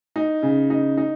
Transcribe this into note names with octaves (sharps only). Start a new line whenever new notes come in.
D#4
C#3
D#4
D#4